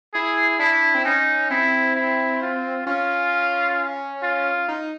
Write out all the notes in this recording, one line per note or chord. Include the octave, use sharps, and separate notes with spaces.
E4 G#4
D4 E4
C4
C#4 D#4
C4 E4
E4
F4
C#4 F4
F4
D#4